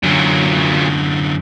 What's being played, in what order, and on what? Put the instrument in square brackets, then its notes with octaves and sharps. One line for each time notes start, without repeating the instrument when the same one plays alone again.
[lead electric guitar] F#2 D3 [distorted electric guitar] A#2 F#3